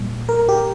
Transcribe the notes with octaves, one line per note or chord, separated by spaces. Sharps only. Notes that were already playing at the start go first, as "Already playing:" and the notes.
Already playing: A#2 G3
A#4
G4